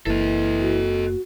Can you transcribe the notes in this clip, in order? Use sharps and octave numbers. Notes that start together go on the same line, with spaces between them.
F#1 E3 A#3 A4 D#5
F#4